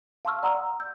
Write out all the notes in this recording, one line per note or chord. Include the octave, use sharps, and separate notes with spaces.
F5 A5 C6 C#6 E6 F6
D5 F#5 A#5 C6 D#6 E6
E6 G6